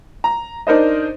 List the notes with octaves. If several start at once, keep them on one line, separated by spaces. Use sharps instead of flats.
A#5
D4 D#4 A#4 C5 D#5